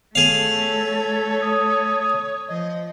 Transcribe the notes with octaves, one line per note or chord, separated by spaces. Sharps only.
A3 G#4 A4 C#5 F5
D#6
F3 D#5